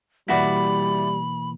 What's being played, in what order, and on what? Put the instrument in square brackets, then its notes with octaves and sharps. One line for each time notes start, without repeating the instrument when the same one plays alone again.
[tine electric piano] B2 E3 A#3 [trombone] G3 [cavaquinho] E4 F#4 D5 [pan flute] B5